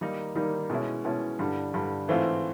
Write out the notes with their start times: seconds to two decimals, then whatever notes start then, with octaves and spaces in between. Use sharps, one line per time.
0.01 D#3 G3 A#3 D#4
0.35 D#3 G3 A#3 D#4
0.70 B2 G#3 C#4 E4
1.04 B2 G#3 C#4 E4
1.39 G2 D3 G3
1.74 G2 D3 G3
2.08 G#2 E3 A3 C4 F4